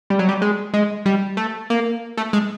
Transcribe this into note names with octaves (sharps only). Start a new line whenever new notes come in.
G3
F#3
G3
G#3
G#3
G3
A3
A#3
A3
G#3